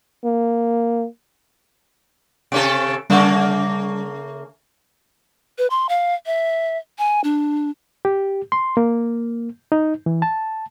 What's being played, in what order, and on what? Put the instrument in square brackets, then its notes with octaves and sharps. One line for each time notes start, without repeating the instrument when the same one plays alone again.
[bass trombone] A#3
[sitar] C3 C#4 A4 [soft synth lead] D7
[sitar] C#3 A3 A#3 [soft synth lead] G3
[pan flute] B4
C6
F5
E5
G#5
D4
[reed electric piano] G4
C6
A#3
D#4
E3
A5